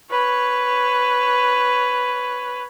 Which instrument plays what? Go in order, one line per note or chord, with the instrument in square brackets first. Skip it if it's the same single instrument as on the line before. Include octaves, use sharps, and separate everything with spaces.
[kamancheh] B4 C#5